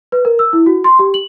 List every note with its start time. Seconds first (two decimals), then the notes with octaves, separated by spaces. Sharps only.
0.12 B4
0.25 A#4
0.39 E6
0.53 E4
0.66 F#4
0.84 C6
0.99 G4
1.14 F#7